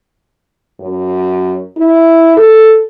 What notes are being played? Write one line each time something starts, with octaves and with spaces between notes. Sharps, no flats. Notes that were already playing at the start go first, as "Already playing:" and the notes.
F#2
E4
A4